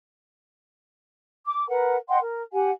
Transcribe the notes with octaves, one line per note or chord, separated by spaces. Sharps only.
D6
A#4 B4 F#5
D#5 F#5 G5 C6
A#4
G4 F#5 G#5